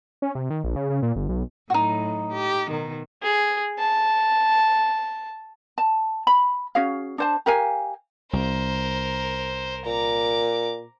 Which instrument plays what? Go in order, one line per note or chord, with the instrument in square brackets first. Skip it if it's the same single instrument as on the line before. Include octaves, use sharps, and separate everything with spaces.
[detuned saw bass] C#4
C3
D#3
A#1
C#3
C#3
A#2
G1
B1
[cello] A2 F#3 [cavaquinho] D#4 F#4
[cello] G4
B2 D#3
[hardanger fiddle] G#4
A5
[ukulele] A5
B5
C#4 F#4 G#4 F5
D4 C5 A5
G4 A#4 F5 G#5
[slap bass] C2 [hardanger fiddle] A#4 C5
[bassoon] A#2 [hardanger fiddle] A#5 D6